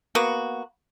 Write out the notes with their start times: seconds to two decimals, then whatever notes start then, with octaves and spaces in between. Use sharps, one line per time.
0.15 A#3 B3 F#4